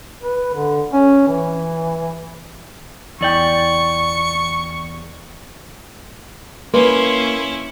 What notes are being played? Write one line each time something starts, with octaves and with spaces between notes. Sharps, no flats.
B4
D3
C#4
E3
E2 D5 G5 C#6
A#3 C#4 E4 B4 C6